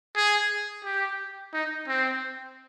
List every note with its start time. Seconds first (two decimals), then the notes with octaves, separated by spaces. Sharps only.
0.15 G#4
0.84 G4
1.53 D#4
1.88 C4